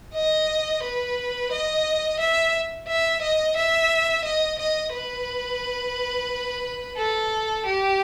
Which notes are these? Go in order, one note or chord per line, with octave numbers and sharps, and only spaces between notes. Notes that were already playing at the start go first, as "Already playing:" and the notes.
D#5
B4
D#5
E5
E5
D#5
E5
D#5
D#5
B4
A4
G4